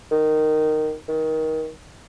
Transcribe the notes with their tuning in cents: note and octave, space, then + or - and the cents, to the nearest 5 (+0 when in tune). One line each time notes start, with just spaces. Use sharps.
D#3 -10
D#3 +25